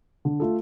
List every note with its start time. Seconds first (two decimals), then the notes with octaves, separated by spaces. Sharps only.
0.25 D3
0.40 A3 F4 A4